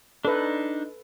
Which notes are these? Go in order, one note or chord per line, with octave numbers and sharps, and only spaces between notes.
D4 D#4 A4 B4